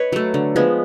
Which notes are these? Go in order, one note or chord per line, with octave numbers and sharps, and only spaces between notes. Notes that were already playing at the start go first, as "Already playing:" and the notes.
Already playing: B4 C#5 D#5
F#3 A3
D3
F3 G#3 B3